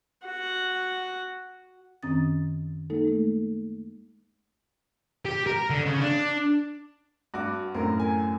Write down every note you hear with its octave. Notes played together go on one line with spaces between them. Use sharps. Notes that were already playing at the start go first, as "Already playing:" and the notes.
F#4 F#5
F#2 D#3 C4 C#4 D#6 A6
G#3 A#3 D#4 A4
G#3 A3
G4
A#4
D3
C#3
D4
G2 F#4 D6
F#2 A2 C4 A#4
G#5